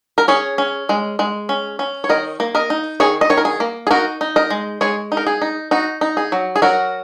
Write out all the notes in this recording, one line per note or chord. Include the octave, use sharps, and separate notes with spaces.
A#4
C#4 G#4 C#5
C#4
G#3
G#3
C#4
C#4
C#5
D#3 A#4 D#5
A#3
A#4 D#5
D#4
D#3 G#4 C#5
D#5
D#3 C#5
A#4
G#4
A#3
G#4
D#4 F#4 A#4
D#4
A#4 D#5
G#3
G#3 G#4 C#5
D#4
A#4
G#4
D#4
D#4 F#4
D#4
G#4
F#3
G#4
F#3 F#4 A#4